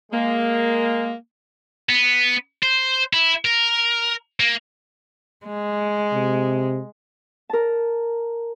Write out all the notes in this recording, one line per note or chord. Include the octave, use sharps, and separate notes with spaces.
G#3 A#3
B3
C5
E4
A#4
A#3
G#3
C3
A#4 A5